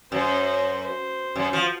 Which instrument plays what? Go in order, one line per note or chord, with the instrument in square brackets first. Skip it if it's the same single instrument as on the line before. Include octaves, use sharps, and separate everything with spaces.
[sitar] F#2 [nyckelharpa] C5
[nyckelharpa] C5
[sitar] F#2
F3